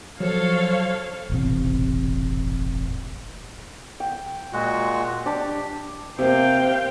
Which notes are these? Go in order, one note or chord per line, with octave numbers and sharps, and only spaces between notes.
F3 F#3 A4 C5 C#5 F5
E1 A1 C3
G5
A#2 G#3 F#4
D4 G4
C3 A#3 C5 F5 G5